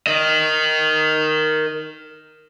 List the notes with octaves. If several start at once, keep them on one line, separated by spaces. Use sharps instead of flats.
A#4 D#5